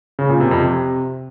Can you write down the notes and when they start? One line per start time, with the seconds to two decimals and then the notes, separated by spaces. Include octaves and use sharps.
0.19 C#3
0.29 A#2
0.40 C3
0.51 F2
0.62 C3